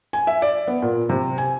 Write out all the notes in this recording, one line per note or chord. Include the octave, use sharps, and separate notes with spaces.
G#5
E5
D5
B3
A#2
C3
G#5